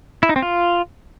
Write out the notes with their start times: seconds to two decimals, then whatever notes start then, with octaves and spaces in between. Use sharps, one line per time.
0.23 E4
0.29 D#4
0.36 C4
0.42 F4